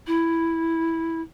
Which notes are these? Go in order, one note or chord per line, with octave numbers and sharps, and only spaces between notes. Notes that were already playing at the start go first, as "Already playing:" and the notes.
E4